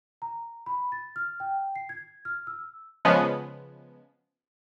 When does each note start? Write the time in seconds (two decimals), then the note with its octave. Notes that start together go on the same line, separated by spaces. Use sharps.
0.22 A#5
0.66 B5
0.92 A6
1.16 F6
1.40 G5
1.76 C7
1.89 G#6
2.25 F6
2.47 E6
3.05 C#3 F3 G#3 B3